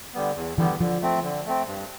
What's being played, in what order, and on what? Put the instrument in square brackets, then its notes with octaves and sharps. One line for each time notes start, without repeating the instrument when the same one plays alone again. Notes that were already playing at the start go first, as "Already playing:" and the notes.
[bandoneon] D3 G3 B3
E2
[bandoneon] D3 G3 B3 [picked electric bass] E3
[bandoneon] D3 [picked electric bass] F3
[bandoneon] A3 C4
D3
A3 C4
G2